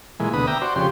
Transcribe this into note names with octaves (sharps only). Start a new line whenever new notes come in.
A#2 E3 G#3
D2 B2 B4 D#6
E5 G5 A#5 D6
F#4 C5 D5
F2 C#3 G4 C6